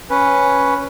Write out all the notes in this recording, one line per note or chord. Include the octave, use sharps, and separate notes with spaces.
C#4 B4